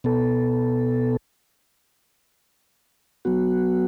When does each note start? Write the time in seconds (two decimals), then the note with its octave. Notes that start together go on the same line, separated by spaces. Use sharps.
0.04 B2 B3 A4
3.25 F#3 B3 F#4